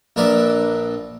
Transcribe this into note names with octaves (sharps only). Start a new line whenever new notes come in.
A#1 D4 A#4 B4 D5 E5